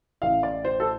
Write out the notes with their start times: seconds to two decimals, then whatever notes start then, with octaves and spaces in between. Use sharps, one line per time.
0.22 A1 A2 A3 F5
0.43 D5
0.65 C5
0.80 A4